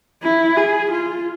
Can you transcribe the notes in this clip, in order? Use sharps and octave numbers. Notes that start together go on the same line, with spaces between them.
E4
G#4
F4